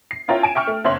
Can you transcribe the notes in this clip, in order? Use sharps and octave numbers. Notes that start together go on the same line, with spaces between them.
C7
C#4 E4 F4 A#4 C#5 G5
G#5 D7 E7
E5 G5 C#6 F6
A3
F#1 C4 C#5 E5 C6 F#7